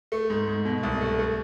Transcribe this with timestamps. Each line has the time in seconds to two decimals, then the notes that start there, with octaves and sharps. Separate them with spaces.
0.12 A3
0.30 G#2
0.48 G#2
0.65 B2
0.83 C2
1.01 A3
1.19 A3